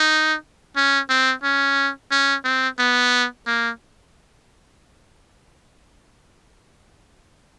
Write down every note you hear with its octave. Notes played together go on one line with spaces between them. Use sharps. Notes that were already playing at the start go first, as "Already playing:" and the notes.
Already playing: D#4
C#4
C4
C#4
C#4
C4
B3
A#3